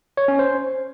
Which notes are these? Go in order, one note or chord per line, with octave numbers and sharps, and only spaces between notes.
C#5
C#4
C5